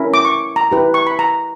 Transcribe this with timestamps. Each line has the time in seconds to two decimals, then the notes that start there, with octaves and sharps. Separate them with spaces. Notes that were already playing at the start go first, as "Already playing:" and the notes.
Already playing: C#4 E4 A#4
0.14 D6
0.25 C#6
0.56 A#5
0.72 E4 G4 B4
0.94 C#6
1.07 B5
1.19 A#5